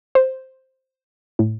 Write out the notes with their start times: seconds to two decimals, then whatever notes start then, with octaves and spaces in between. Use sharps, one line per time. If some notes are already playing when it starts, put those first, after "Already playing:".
0.15 C5
1.39 A2